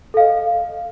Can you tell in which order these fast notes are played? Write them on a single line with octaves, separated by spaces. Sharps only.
A4 F5 D#5